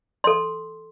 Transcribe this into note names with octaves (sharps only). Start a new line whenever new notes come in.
A4 C6